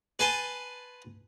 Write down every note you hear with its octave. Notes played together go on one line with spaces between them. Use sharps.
B4 G#5 A5 C6